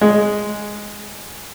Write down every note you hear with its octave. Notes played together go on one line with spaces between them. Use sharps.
G#3